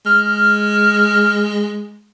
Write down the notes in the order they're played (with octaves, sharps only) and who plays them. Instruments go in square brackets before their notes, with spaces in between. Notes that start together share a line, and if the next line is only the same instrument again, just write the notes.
[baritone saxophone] G#3 [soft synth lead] F6